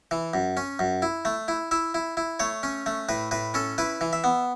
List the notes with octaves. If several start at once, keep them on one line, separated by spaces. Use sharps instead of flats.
E3
F#2
C#4
F#2
E4
A3
E4
E4 E5
E4
E4
A3 C#5
C#4
A3
A2 B4
A2 B4
C#4 A4
E4 B4
E3
E5
B3